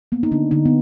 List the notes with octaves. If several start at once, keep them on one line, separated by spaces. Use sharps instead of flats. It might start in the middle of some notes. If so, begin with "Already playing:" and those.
A#3 B3
D#4
D3 D4
D3 D#4
B3